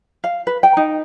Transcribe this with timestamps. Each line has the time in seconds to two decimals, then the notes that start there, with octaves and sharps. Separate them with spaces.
0.24 F5
0.47 B4
0.63 G5
0.77 D#4